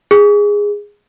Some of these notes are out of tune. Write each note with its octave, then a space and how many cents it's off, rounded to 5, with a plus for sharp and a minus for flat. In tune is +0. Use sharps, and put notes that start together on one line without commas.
G#4 -10